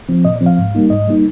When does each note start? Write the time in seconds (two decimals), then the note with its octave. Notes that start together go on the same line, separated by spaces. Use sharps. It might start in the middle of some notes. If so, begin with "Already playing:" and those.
0.09 F3 C4
0.25 A#2 D#5
0.36 D5
0.41 F3 C4
0.46 F5
0.58 G#2
0.75 G3 A#3 D#4
0.90 G#2 D#5
1.07 G3 A#3 D#4